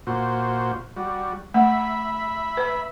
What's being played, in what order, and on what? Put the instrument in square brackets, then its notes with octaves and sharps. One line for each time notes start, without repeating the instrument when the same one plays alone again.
[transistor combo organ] A#2 F#4 C5
G3 F#4
[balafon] A3 [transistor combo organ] E5 B5
[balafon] B4